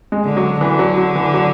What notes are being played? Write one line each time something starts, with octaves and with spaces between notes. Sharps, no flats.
G#3
D3
F#3
D3 E3
F#3
F#3
E3
F#3